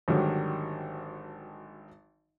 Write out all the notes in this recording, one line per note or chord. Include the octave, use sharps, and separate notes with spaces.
G#1 D3 D#3 F#3 G3